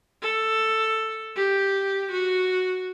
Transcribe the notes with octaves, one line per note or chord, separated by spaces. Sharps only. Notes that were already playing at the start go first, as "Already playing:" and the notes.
A4
G4
F#4